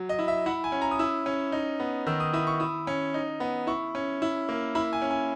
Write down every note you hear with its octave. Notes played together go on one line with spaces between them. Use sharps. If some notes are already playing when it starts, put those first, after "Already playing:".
Already playing: F#3
D#5
E4
E5
E4 F#5
G#5
C#4
A#5
D#6
E4 E6
C#4
D#4
B3
D#3 E6
D#6
E4 D#6
C#6
E4 D#6
C#4
D#4
B3
E4 C#6
C#4
E4
A#3
E4 B5
G#5
C#4
G#5